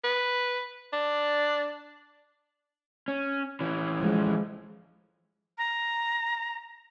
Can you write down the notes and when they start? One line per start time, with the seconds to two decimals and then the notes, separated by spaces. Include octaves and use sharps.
0.04 B4
0.93 D4
3.08 C#4
3.60 E3 C#4
4.01 F3 G#3
5.58 A#5